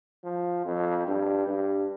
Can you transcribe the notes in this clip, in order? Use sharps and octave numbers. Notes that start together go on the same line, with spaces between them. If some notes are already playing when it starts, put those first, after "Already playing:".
F3
F2
G2
G2